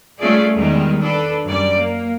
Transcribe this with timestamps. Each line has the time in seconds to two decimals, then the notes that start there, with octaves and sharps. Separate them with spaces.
0.18 G3 A3 C#4 F4 G#4 D5
0.56 E2 D#3 G3 G#3
0.98 D4 A4 B4
1.45 F#2 G3 D5
1.77 A#3